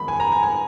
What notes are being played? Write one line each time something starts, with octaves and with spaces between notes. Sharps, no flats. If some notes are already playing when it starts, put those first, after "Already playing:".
Already playing: F2 D#3 G#3 B3 B5
G#5
A#5
G#5
G#5